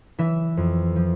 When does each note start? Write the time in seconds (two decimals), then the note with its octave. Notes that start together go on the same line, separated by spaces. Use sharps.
0.18 E3 E5
0.57 F2
0.96 F3